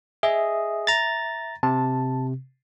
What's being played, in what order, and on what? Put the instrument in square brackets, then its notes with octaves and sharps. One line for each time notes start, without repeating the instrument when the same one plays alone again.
[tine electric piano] G#4 D#5 [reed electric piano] E5
[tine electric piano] A#5 A6
[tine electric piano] C3 [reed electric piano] A5